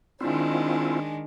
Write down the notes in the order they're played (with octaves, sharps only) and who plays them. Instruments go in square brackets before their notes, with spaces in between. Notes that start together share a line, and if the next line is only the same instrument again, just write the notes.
[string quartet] D#3 G#3 D4 [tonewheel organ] C4 E4 F4